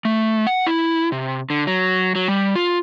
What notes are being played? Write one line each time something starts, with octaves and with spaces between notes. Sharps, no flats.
A3
F#5
E4
C3
D3
F#3
F#3
G3
F4